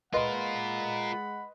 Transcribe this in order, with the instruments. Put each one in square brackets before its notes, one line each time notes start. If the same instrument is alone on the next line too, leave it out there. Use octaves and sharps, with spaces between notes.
[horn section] G#3 F#5 B5 [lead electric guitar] F4 A#4 [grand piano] B4 D#5 C6